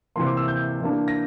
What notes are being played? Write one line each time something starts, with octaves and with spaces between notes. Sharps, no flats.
C3 E3 A#3 C6
D6
E6
G6
E3 A#3 D4
A#6